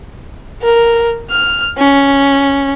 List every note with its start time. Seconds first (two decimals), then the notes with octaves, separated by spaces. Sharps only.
0.62 A#4
1.31 F6
1.78 C#4